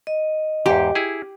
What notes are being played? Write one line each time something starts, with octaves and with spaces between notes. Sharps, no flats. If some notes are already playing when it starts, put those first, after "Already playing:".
D#5
E2 G#2 G4
E4 G#4